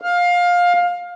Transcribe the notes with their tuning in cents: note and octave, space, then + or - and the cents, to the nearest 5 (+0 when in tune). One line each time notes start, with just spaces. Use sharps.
F5 +20